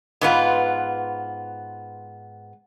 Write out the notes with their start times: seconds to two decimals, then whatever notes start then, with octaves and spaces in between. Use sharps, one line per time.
0.21 G#2 B3 F4 B4